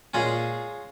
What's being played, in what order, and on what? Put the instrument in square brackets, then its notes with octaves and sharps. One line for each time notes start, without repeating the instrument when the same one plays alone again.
[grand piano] A#2 [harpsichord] G#3 C#4 F4 G#4 D#5